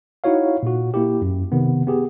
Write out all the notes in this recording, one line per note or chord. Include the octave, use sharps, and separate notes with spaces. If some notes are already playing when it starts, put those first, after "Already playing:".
D#4 E4 F#4 C#5 F5
A#2 F#4
A#3 E4 G4
F#2
C3 D#3 B3
B3 G4 G#4